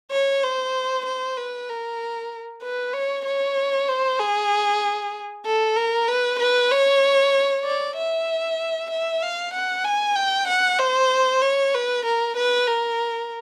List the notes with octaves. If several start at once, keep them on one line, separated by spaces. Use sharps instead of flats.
C#5
C5
C5
B4
A#4
B4
C#5
C#5
C5
G#4
A4
A#4
B4
B4
C#5
D5
E5
E5
F5
F#5
G#5
G5
F#5
C5
C#5
B4
A#4
B4
A#4